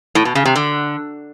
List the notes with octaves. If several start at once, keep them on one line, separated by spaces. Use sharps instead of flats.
A2
B2
C#3
C3
D3